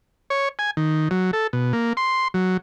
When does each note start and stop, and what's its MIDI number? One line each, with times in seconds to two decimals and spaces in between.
0.30 0.49 73
0.59 0.71 80
0.77 1.08 51
1.11 1.31 54
1.33 1.47 69
1.53 1.73 47
1.73 1.93 58
1.97 2.28 84
2.34 2.57 54